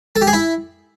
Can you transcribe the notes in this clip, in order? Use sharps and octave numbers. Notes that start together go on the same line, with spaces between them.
A4
G4
G#4
E4